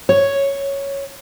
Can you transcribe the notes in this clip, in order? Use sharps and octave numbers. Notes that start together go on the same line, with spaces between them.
C#5